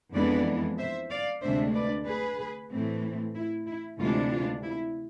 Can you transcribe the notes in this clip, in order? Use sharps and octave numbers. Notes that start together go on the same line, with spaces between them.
F2 E3 G#3 B3 D4 B4 D5
C5 E5
D5 F5
D2 C3 G#3 D4 C5 E5
B4 D5
G#4 B4
A2 E3 A3 C4
E4
E4
D2 C3 E3 G#3 D4 F4
F4
E4